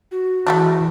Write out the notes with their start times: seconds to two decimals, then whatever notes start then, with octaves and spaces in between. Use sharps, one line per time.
0.11 F#4
0.47 E3 G#3 A3 D4